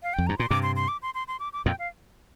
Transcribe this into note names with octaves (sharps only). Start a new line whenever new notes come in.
F5
F2 G5
G2 A#5
A#2 C6
G2 C3 D6
C6
C6
D6
C6
C6
C6
D6
D6
F2 A#2 G5
F5